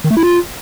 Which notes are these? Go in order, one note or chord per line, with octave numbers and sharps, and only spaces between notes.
D#3
A3
E4
F4